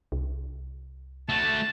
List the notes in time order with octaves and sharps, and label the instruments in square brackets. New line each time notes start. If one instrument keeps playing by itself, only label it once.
[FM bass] C2
[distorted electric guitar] A3 F#4 [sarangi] A5